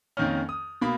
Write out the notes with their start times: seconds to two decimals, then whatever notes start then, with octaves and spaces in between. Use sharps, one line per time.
0.17 F2 D#3 A#3 C#4 F6
0.49 D#6
0.81 B2 A#3 B5